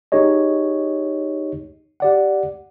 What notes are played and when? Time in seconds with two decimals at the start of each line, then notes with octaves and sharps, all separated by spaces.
0.12 D#4 G4 G#4 C#5 D#5
2.00 G4 D5 F#5